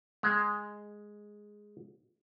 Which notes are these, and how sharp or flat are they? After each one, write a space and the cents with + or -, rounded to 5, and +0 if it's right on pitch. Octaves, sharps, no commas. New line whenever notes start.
G#3 +0 A#5 +0